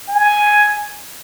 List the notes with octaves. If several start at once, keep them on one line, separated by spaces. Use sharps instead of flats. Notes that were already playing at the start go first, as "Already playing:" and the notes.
G#5